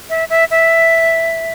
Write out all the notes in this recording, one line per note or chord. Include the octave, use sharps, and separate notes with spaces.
E5
E5
E5